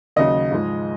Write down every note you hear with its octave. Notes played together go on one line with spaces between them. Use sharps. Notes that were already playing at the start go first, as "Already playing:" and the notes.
D#2 C#3 F#3 D#5
G#2 F3 G#3